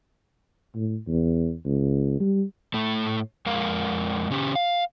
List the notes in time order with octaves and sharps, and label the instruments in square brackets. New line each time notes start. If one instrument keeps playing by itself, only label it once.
[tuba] A2
E2
C#2
G3
[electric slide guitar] A2 A3
F2 G#3 A#4 F5
C#3 C#4 G4
F5